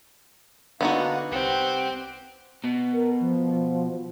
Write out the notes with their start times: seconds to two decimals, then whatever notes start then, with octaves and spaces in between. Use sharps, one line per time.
0.81 D3 A#3 B3 D4 D#4 F#4 F#5
1.32 C2 C4 G4 F#5
2.64 B2
2.93 A#4
3.20 F3